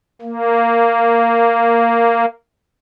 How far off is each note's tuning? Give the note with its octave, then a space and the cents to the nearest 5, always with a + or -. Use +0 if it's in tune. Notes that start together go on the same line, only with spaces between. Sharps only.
A#3 -10